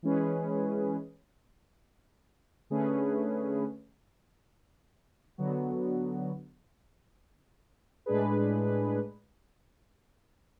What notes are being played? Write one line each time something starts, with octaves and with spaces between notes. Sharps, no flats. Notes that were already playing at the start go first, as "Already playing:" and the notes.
E3 G#3 C#4 G#4 B4
D3 A3 C#4 G#4 B4
D3 F#3 B3 F#4
A2 G#3 D4 G#4 B4